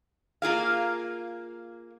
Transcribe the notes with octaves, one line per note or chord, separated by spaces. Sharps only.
A#3 F4 G#4 F5